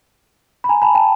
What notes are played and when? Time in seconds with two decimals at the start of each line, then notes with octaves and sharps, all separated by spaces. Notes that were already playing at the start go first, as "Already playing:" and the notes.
0.64 B5
0.69 G#5 A#5
0.82 A5 B5
0.95 G5 A5